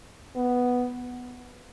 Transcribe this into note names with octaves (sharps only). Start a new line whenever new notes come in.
B3